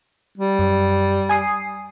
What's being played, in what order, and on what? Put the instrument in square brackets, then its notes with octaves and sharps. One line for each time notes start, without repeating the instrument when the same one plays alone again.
[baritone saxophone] G3
[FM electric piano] F#2
G#5 D#6 C7